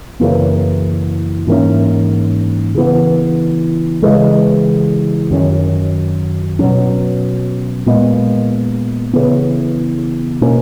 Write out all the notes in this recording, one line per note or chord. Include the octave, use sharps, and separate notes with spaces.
F#2 C#3 E3 A#3
G#2 E3 A#3 C#4
C#3 E3 B3
C#3 E3 G#3
F#2 D#3 F#3 C#4
B2 F#3 C#4
A#2 G#3 B3
C#3 E3 B3
B2 A#3 C#4